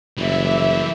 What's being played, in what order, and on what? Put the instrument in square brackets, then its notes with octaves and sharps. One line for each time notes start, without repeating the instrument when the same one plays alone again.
[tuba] F#1 [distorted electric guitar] E3 G3 [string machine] E5